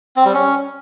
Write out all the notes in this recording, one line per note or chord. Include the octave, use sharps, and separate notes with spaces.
C4
G3
C#4